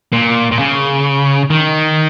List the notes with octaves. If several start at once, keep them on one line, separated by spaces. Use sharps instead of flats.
A#2
A#2
C#3
D#3